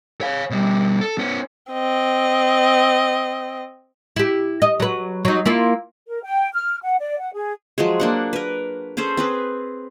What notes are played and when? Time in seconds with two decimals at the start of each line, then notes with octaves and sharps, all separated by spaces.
0.21 C#5 F5
0.50 B2 G3
1.01 A4
1.18 B3 C#4
1.72 C4 D#5
4.16 E4 G4
4.62 D#5
4.80 F#3 B4
5.25 F#3 D#4
5.46 A#3 E4 F4
6.07 A#4
6.22 G5
6.54 F6
6.82 F#5
7.00 D5
7.20 F#5
7.33 G#4
7.78 F3 F#3 G#3 G#4
8.00 A#3 D4 F#5
8.33 A#4 B4
8.97 C#4 G#4 A4 C5
9.17 C4 G#4 B4